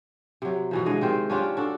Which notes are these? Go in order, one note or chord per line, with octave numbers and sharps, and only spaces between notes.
C3 F#3
B2 E3 F3
D3 G#3 D#5
C3 D#3 C4
C#4 D4 F4 G4
D4 F#4 A4